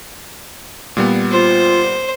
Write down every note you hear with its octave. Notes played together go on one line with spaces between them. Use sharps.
A#2 G3 B3
F4 C5